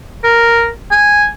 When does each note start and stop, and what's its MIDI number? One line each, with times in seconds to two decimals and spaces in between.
0.24 0.68 70
0.91 1.26 80